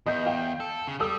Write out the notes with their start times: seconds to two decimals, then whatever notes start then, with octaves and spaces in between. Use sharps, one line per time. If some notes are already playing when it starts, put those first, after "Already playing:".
0.06 E2 D#5 G6
0.26 F5 G5
0.60 A4
0.88 C#3
1.00 G3 A4 D#6 E6